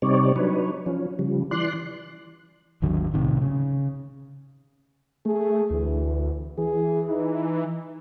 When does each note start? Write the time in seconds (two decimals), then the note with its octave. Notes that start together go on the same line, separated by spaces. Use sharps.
0.02 C3 G3 C4 D#4 C#5 D5
0.36 F#3 D4 D#4 B4 C#5
0.86 F3 C#4
1.19 C#3 F3 G3
1.51 E3 D5 C6 F#6
2.82 G#1 D#2 D3 F#3
3.14 B1 A2 C3 D#3
3.42 C#3
5.26 A3 G#4
5.71 D2 E3
6.58 E3 G#4
7.09 D#4